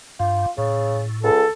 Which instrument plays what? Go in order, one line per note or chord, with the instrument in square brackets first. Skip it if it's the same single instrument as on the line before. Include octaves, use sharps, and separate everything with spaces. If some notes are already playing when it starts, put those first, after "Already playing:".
[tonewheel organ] G2 [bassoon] F4
[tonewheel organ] A2 [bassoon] C#3
[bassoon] C#2 [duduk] A4